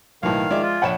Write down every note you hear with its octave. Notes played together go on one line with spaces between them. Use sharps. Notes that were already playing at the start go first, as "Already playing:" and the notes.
B1 A2 D#3 F5
F3 G#3 D5 E5 D6
F4
A#1 C#5 F#5 G5 B5 E7